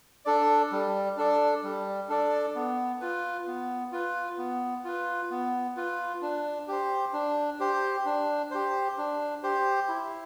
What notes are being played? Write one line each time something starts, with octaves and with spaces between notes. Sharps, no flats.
D4 A4 D5
G3
D4 A4 D5
G3
D4 A4 D5
B3
F4 B4
B3
F4 B4
B3
F4 B4
B3
F4 B4
D4
G4 C5
D4
G4 C5
D4
G4 C5
D4
G4 C5
E4